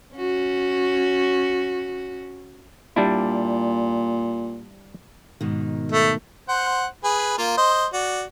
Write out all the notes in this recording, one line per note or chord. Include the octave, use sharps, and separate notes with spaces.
C#4 F#4
A#2 G3 D4 E4
G#2 B2 D#3
A3
C5 F#5
G#4 B4
A#3 F4
C5 D#5
F#4 D5